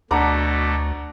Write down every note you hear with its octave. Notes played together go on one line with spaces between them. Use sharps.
D2 B2 A3 D4 D5 F#5 A#5